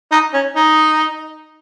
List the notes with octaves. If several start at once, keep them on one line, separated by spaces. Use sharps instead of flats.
D#4
C#4
D#4